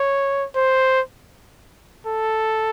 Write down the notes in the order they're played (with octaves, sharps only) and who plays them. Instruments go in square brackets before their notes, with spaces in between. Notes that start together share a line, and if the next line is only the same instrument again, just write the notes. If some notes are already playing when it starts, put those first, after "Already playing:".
Already playing: [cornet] C#5
C5
A4